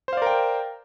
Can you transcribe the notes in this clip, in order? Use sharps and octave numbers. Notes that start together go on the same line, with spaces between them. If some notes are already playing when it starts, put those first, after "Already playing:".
A#4 C5 D5 F5 G5